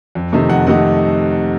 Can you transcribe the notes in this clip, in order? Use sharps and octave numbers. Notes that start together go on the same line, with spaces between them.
F2
C3 D#3 A3 D#4
F2 F#5
C3 D#3 A3 D#4 F#5